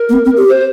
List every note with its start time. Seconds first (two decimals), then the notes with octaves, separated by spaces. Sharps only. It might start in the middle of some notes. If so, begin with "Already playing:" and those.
Already playing: A#4
0.09 A#3
0.13 C4
0.25 C4
0.37 G4
0.48 C5